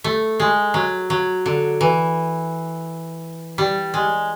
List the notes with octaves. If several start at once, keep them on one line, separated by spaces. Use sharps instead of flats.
A3
G#3
F#3
F#3
D3
E3
G3
G#3